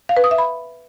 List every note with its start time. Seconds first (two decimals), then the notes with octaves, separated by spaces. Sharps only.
0.09 F5
0.17 B4
0.24 D#6
0.31 E5
0.38 B5